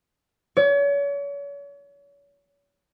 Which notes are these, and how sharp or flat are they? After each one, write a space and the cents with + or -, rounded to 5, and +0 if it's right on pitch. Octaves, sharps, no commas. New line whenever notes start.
C#5 +40